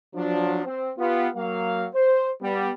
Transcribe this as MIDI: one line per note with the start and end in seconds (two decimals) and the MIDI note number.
0.14 0.63 53
0.14 0.63 54
0.14 0.63 62
0.65 0.90 60
0.65 0.90 72
0.98 1.27 59
0.98 1.27 65
0.98 1.27 67
1.35 1.86 54
1.35 1.86 58
1.35 1.86 77
1.94 2.29 72
2.42 2.71 55
2.42 2.71 59